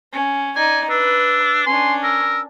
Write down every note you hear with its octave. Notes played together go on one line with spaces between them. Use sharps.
C#4
D#4 D5 G#5
D4 B4 E6
C#4 D4 G#5 C6
A#4 E6